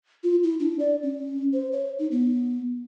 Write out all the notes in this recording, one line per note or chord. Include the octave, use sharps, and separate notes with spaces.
F4
E4
D4
D5
C#4
C5
C#5
D#4
B3